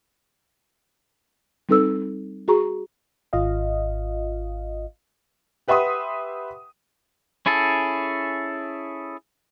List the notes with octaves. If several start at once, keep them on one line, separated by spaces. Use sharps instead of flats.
G3 C4 D#4 A4 B4 E6
F#4 G#4 A#5 C#6
G#1 F4 D#5 F5
G4 B4 E5 F#5 C6 D#6
C#4 E4 G#4 A4